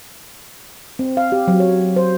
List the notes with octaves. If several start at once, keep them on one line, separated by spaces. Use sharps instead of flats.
C4
F5
G4
F#3
C#5
C5